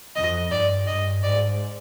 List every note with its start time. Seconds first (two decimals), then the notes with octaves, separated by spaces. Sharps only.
0.16 F2 D#5
0.51 G2 D5
0.87 G2 D#5
1.24 G#2 D5